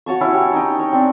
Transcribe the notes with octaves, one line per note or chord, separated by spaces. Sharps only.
F#4 C#5 A5 C#6
C#4 E4 C#6
G4
D#4 G5
C#5
C4 D4